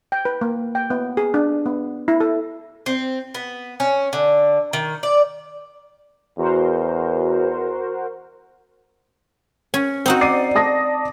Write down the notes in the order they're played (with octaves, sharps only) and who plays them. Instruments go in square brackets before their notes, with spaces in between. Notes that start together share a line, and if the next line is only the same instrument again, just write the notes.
[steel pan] G5
B4
A#3
G5
B3
G#4
D4
B3
E4
A4
[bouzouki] C4
B3
C#4
D3
D#3
D5
[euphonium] E2 [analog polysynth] F#4 A#4 C5
[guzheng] C#4
C4 D#4 F#4
[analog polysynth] D5 [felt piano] C7 D#7
[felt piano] A5 D#6 A#6